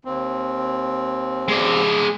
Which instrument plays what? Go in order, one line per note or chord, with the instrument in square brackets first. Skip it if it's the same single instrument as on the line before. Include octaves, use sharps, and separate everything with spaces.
[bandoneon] D#2 C4
[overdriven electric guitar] G#3 D5